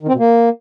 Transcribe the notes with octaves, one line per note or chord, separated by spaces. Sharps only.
D#3
C4
B2
A#3